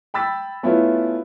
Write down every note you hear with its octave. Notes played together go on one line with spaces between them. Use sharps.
G5 B5 E6 A6 B6
A3 B3 C#4 E4 F4